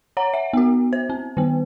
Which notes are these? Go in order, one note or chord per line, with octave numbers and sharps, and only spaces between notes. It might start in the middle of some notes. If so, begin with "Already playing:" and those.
C#5 F#5 A#5
E5 F#5
B3 F#4
C5
C4
D#3 B3